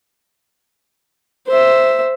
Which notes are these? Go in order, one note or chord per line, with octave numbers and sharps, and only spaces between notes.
C5 E5